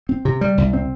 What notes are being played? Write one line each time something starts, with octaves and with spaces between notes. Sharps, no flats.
C4
C3
G3
C2
C4